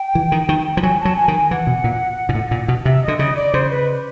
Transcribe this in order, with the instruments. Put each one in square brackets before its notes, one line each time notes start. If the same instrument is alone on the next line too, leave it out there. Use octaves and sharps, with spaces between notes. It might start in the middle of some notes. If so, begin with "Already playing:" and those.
Already playing: [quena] G5
[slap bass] E3
D#3
D#3
F3
[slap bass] F#3 [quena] G#5
[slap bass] F#3 [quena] A5
[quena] G#5
[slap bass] D#3
[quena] G#5
[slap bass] E3 [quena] F#5
[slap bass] B2
A#2
A#2
A2
A#2
B2
[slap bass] C3 [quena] E5
[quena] D#5
[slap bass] D3
[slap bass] C#3 [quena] D#5
[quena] D5
[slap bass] C#3 [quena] C5
[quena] B4